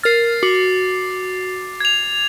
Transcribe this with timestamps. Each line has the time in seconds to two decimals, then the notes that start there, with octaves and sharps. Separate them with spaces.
0.03 A#4 F6 A6 C7
0.43 F#4 D6
1.80 G#6 F7